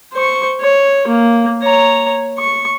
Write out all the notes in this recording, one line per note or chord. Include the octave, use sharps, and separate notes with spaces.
C5 C#6
C#5
A#3
C#5 A#5
C#6